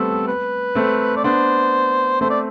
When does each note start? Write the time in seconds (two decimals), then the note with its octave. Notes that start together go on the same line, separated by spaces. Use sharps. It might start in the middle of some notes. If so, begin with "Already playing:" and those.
Already playing: G3 A3 B3 C4 A4
0.28 B4
0.75 A3 C4
1.17 D5
1.24 B3 D4 C5
2.21 A3 C4 C5
2.30 D5